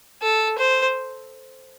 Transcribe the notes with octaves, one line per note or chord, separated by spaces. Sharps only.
A4
C5